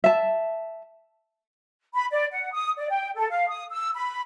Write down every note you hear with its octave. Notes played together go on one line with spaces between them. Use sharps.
E5 A5
B5
D5
F#5
D#6
D5
G5
A4
F5
D#6
E6
B5